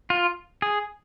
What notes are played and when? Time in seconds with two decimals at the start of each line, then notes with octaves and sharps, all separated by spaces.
0.10 F4
0.62 G#4